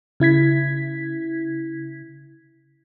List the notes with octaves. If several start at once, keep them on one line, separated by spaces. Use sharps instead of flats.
C#3 E4 G#6 B6